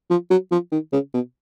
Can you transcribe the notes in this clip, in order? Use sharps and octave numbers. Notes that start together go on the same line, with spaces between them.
F3
F#3
F3
D#3
C#3
B2